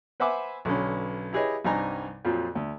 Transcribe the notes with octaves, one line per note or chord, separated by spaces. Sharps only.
B4 C5 E5 F#5 G#5 D6
B1 D3 B3 C#4
E4 G4 G#4 B4 C#5 D#5
C2 G2 D#4 G#5 A#5
F2 A#2 F3 F#3
D2